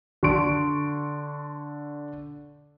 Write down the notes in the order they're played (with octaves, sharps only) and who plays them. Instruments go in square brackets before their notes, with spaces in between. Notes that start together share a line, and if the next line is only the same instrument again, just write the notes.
[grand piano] D3 C6 C#6 D7